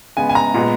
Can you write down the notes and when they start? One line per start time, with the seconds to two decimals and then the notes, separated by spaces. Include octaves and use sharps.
0.17 C#3 G#3 B3 G#5
0.29 G#5
0.35 A#5
0.54 A#2 G#3 B3